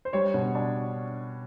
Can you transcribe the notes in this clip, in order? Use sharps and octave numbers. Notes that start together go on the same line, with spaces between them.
C5
G3 C#5
B2
D4